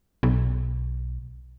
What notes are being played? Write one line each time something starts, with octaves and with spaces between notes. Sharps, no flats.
B1